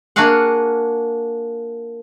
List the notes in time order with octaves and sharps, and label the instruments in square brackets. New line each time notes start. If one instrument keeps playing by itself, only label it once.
[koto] A#3 D4 F#4 G#4 F5 F#5